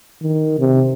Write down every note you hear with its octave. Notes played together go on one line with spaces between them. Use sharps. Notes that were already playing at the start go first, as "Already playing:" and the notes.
D#3
C3